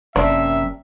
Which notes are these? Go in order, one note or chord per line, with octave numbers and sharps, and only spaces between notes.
G1 F#2 C3 A#3 D4 E5